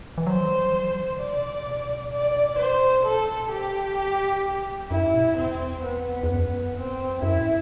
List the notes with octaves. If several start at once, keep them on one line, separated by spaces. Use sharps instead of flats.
E3
F#3 C5
E3
G3
F#3
G3
F#3
E3
D3
C3 D5
B2
C3
B2
D5
C5
A4
A2 G4
G2
F#3
E3
G2
F#2
F#2 E4
G2
B2
F#2
E2 C4
B3
E2
F#2
C4
E2
F#2 E4
A2